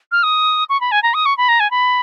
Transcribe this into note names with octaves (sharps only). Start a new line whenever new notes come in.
F6
D#6
C#6
B5
G#5
A#5
D#6
C#6
B5
A#5
G#5
B5